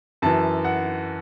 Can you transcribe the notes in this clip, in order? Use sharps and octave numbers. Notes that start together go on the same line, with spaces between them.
F#2 E3 A5
F#5